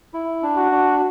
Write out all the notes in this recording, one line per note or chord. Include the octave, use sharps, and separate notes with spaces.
E4
D4
F#4
D4